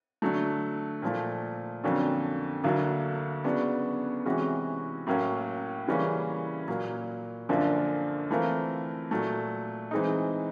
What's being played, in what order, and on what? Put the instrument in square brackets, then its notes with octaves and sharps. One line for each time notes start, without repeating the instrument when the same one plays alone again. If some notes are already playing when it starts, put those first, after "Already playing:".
[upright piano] D3 F#3 A3
A#2 F3 A3
F2 D3 F#3 A#3 C#4
D2 D3 F#3 A#3
C#3 F#3 B3 D4 F#4
C3 E3 G#3 C#4 F#4
A2 F#3 A#3 C#4
C#3 E3 G3 A#3 C#4
A#2 F#3 A#3
F#2 D3 F3 A#3 D4
E3 A3 C4 F4 A#4
A#2 F#3 A3
E3 G#3 C4 D#4